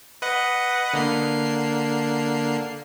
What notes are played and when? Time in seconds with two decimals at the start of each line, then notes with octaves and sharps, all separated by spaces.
0.22 B4 D#5 F#5
0.93 D3 A#3 C7